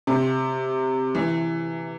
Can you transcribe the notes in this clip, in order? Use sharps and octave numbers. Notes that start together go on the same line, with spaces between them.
C3
E3